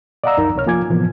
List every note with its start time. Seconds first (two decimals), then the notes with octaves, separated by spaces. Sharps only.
0.24 D5 D#5 F5 F#5 A#5 E6
0.37 C2 F#2 D#4 A#4 A#5
0.55 C2 C3 C#5 F6
0.66 F3 A#3 F4 G#5 D6 G#6
0.89 A2 C3 E3 F3 A#3 B3